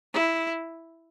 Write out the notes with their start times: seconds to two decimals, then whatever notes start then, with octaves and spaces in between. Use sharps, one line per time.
0.14 E4